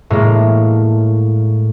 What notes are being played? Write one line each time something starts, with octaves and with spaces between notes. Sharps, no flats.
A2 G#3 A#3